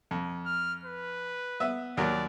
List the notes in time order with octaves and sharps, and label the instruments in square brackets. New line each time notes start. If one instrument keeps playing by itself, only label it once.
[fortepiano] F2
[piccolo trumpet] F6
B4
[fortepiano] B3 E5
[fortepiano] D#2 F#3 A#4 [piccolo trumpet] D5